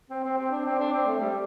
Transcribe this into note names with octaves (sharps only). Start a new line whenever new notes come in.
C4
C4
C4
D4
C4
D4
C4
A3
G3